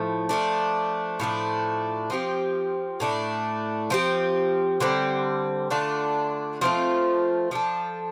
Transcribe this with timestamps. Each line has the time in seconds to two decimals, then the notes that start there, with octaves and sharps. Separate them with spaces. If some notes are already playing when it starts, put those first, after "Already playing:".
Already playing: A2 F3 A3
0.29 F3 A3 D4
1.20 A2 F3 A3 D4
2.10 F3 C4 G4
3.00 A2 A3 D4
3.90 F3 C4 G4
4.80 D3 G3 C4
5.70 D3 A3 D4 F4
6.61 F3 A3 C4 F4
7.51 F3 D4 A4